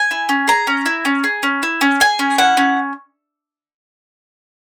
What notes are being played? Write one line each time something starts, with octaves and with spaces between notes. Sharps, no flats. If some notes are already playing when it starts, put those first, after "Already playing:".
Already playing: G#5
E4
C#4
G#4 A#5
C#4
E4
C#4
G#4
C#4
E4
C#4
G#4 G#5
C#4
E4 F#5
C#4